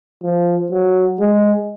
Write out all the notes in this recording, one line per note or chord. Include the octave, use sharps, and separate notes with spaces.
F3
F#3
G#3